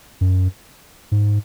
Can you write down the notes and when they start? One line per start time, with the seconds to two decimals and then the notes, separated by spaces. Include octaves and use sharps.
0.21 F#2
1.12 G#2